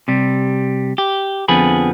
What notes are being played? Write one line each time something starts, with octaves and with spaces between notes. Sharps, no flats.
C3 G3
G4
F2 D3 F3 B3 G#4 B5